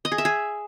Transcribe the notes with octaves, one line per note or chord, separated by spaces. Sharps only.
D#5
G#4
E5
G#4